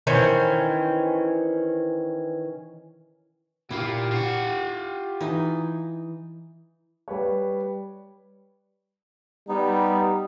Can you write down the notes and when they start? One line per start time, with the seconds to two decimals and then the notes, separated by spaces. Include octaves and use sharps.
0.07 D#3 E3 C#4 C5
3.71 A#2 E4 F4 G4
4.11 F4 F#5
5.20 E3 D#4
7.08 G3 B4 C#5
9.49 G3 B3 D#4